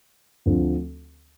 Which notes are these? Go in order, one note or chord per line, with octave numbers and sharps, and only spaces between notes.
D2 D3 F3 A3 C4